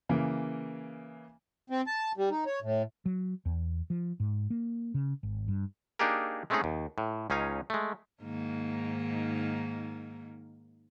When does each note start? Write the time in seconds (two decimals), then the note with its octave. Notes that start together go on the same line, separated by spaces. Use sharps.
0.09 C#3 E3 A#3
1.70 C4
1.87 A5
2.17 G3
2.31 D#4
2.46 C#5
2.62 A2
3.06 F#3
3.45 E2
3.90 F3
4.20 G#2
4.50 A#3
4.94 C#3
5.23 G#1
5.48 G2
5.99 A#3 D4 D#4 G4 G#4 A#4
6.50 G#3 A3 C4 C#4 D#4 G#4
6.64 D#2
6.98 A2
7.30 C#2 C#4 D#4 F5 G#5
7.70 G#3 A3
8.22 G#2 D#3 A#3